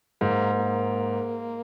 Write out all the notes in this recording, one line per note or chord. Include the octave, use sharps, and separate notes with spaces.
G#2 A#3
A#3